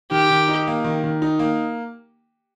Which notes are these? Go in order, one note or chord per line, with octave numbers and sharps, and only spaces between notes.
D#3 G4
D#3
D#4
A#3
D#3
D#3
D#4
A#3